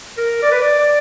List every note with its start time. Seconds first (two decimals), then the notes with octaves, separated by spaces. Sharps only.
0.17 A#4
0.42 D5
0.52 B4
0.62 D5
0.79 D5